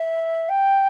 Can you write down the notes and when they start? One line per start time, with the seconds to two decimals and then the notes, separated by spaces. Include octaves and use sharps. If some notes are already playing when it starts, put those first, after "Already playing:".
Already playing: E5
0.49 G5